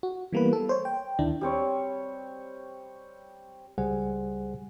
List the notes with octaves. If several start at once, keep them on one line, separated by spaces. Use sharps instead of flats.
F#4
E3 G3 A#3 B3 B4
A4
C5 C#5
G5
D2 D#3 D4 E4
G3 C4 C#5
C#2 G3 G#4 C5 F#5 G#5